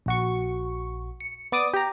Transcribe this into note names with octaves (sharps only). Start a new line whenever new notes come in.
A#1 F#4 C#6
C#7
B3 D5 D6 D#6
G4 A#5